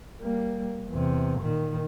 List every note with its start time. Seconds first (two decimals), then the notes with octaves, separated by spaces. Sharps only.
0.20 G3 A#3
0.89 E2 C3
1.40 A#2 D#3